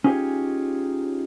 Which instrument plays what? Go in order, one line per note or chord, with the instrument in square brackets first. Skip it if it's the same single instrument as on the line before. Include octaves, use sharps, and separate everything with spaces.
[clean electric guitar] C#4 D#4 F4 G4 G#4 C#5